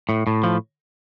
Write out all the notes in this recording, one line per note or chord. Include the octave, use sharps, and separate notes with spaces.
A2
A2
F3